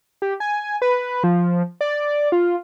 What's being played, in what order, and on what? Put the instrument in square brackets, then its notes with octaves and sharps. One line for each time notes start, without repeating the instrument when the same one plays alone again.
[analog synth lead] G4
G#5
B4
F3
D5
F4